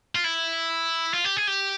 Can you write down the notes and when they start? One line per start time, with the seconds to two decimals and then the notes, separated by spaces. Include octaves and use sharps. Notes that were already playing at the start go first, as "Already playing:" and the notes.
0.15 F4
0.24 E4
1.14 F4
1.24 G4
1.37 G#4
1.47 G4